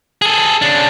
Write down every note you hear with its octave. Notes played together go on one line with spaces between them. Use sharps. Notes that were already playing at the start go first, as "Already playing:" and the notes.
G#4 A4
C#3 D4